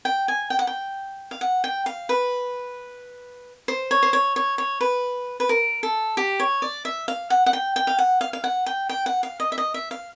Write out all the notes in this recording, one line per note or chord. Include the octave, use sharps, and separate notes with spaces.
G5
G#5
G5
F#5
G5
F5
F#5
G5
F5
B4
C5
C#5
C5
C#5
C#5
C#5
B4
B4
A#4
A4
G4
C#5
D5
E5
F5
F#5
F#5
G5
G5
F5
F#5
F5
F5
F#5
G5
G5
F#5
F5
D#5
E5
D#5
E5
F5